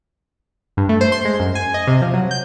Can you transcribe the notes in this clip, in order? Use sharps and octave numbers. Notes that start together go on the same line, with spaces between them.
G2
A3
C5
C6
G#3
F#2
G#5
D#5
C3
F3
F#3
G6